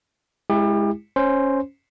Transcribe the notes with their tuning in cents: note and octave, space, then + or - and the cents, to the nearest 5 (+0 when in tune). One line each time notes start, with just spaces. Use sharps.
G#3 +0 E4 -10 G4 +35
C#4 -5 C5 +0